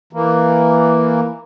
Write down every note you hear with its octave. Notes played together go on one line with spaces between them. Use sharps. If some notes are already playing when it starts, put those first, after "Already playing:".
E3 A#3